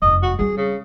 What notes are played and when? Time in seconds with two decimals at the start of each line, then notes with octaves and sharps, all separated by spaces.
0.02 F1 F#2 D#5
0.23 F#4
0.39 G3 C4 G#4
0.57 C#3